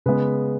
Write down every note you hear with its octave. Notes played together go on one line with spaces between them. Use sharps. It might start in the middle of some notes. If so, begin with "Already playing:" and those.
C#3 G#3 B3 B4